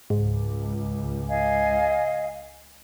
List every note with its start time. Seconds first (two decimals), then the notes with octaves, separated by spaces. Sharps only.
0.10 C#2 G#2
1.28 D#5 F5 G#5